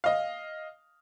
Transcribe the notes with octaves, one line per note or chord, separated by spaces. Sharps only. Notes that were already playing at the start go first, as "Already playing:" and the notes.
D#5 F5